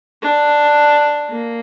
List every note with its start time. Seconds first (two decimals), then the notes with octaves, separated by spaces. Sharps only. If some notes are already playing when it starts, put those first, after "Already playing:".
0.23 D4
1.30 A#3